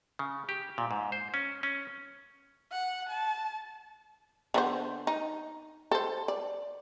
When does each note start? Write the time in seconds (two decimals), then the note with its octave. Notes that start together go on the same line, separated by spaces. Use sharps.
0.19 C#3
0.49 G4
0.78 A#2
0.91 G#2
1.12 C5
1.34 C#4
1.63 C#4
2.72 F#5
3.09 A5
4.54 D3 B3 C5
5.07 D#4
5.91 A4 C5
6.28 D5